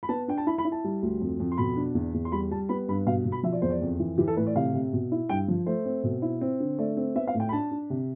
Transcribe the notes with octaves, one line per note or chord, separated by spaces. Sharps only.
B5
B3 A5
D4 G5
A5
E4 B5
B5
E4
A5
G3
D2
F2
F2
C6
B2 B5
D4
E2
E2
C6
G3 B5
G3 A5
B3 B5
G2 B5
B2 F5
B2
B5
F3 E5
D5
E2 C5
D5
F2
E3
E3 G4
A4
A2 B4
D5
C3 F5
C3
B2
E4
G2 G5
F3
A3 C5
C4
B2
E4
C4
D3
A3 D5
C4
B3 E5
F5
A2
G5
B5
D4 A5
D4
C3